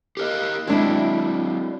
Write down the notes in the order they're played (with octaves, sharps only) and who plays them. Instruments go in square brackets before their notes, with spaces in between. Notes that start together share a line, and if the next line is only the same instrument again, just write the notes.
[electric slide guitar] G4 A#4 D#5
[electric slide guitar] F#3 C4 [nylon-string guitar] G#3 D4 E4